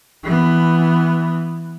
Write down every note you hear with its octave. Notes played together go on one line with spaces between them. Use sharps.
E3 B3